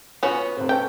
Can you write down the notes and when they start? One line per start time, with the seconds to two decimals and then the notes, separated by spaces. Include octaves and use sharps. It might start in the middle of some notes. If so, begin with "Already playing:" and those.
0.23 B3 C#4 F4 F#4
0.57 F1 C4
0.69 B3 C#4 A4 G5